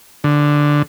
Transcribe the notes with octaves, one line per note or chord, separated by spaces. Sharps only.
D3